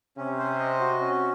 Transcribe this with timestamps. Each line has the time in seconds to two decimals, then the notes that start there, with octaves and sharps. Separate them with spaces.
0.17 C3 C#4
0.39 C5
0.59 D#5
0.80 F#4
1.01 C#4